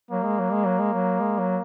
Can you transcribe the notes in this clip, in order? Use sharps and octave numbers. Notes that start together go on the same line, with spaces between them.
F#3 A#3
G#3
F#3
G#3
F#3
G#3
F#3
G#3
F#3